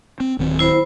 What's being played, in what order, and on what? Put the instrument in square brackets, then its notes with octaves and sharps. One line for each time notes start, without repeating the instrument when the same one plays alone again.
[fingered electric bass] C4
D1 D#3 C4
[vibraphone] E4 C5 B5